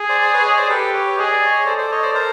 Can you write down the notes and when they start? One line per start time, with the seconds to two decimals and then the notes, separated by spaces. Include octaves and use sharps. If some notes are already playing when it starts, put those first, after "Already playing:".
Already playing: G#4
0.09 C5 D5
0.21 C5 D5
0.33 B4 C#5
0.45 C#5 D#5
0.57 C5 D5
0.69 G4 A4 B4
0.94 B4 C#5
1.18 G#4 D#5
1.32 D5
1.45 C#5 D#5
1.66 A4 C5 D5
1.78 C5 D5
1.91 C#5 D#5
2.03 C5 D5
2.15 A#4 C5